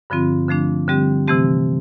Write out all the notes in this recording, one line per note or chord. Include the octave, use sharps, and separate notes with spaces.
G2 D3 F3 C4 F4
D3 F3 A3 D4
D3 G3 C4 G4
C3 E3 A3 C4 G4